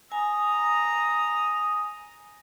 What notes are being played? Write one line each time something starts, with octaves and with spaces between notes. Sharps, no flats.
G#5 A#5 D#6